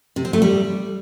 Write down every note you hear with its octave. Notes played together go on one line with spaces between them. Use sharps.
C3
C4
A3
G3